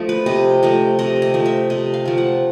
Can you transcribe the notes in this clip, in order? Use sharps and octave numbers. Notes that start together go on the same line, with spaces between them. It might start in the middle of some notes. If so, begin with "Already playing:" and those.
Already playing: F3 A3 D#5
B4
C3 D#5
F3 A3 D#5
C3 D#5
D#5
F3 A3
E5
C3 D#5
F5
F3 A3
F#5